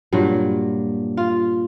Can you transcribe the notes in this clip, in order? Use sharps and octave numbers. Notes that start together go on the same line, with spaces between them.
G2 A#2 F#3
F4